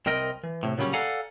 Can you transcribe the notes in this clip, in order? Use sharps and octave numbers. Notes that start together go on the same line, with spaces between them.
C2 C4 A#4 D#5 G5
E3
A2 C3
A#2 C#3 F#3 G3 C#4
A4 D5 F5 F#5 G#5 A#5